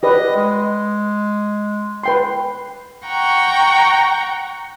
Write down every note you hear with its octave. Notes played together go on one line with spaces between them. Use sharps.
G4 B4 D5 D#5
G#3
B4 G5 C6
F#5 G5 A#5 C#6